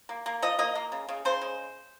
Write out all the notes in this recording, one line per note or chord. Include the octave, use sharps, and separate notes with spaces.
A#3
A#3
F3 D#5
A#3 D#5
A#3
C#3
C#3
C#3 C5
G#3